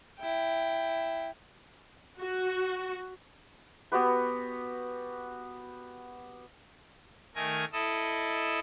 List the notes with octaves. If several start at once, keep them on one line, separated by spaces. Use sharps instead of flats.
E4 G5
F#4
B3 F#4 G4 B4
D#3 A3 A#4 G#5
E4 A4 D#5 E6